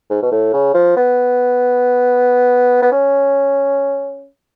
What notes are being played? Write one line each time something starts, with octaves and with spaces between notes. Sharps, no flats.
G#2
B2
A2
C#3
F3
B3
B3
C#4